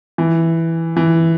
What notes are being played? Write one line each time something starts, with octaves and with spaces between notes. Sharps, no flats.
E3
E3